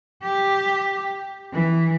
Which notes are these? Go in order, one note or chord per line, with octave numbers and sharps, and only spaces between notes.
G4
E3